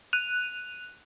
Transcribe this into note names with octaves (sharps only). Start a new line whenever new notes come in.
F#6 D#7 F7